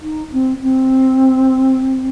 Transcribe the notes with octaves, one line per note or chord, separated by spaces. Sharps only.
D#4
C4
C4